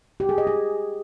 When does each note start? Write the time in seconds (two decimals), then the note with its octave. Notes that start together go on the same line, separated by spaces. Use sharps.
0.20 G4
0.29 G#4
0.38 D#5
0.47 G#4